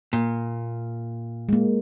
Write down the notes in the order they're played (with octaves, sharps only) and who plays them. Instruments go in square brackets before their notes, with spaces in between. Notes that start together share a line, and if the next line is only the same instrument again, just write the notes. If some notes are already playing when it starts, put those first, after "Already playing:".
[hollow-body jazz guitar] A#2
[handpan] G#3 A#3